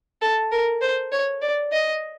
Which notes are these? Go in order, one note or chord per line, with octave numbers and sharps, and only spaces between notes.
A4
A#4
C5
C#5
D5
D#5